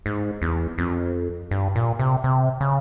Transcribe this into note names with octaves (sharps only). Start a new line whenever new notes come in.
G#2
E2
F2
G2
A#2
C3
C3
C#3